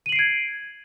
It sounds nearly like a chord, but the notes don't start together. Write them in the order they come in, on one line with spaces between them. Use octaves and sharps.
D#7 F#7 C7 D7 G#6